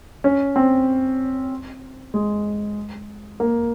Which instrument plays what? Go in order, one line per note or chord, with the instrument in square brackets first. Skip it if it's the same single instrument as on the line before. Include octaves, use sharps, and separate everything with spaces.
[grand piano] C#4
C4
G#3
A#3